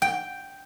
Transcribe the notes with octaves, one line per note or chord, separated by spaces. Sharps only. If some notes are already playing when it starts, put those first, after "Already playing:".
G5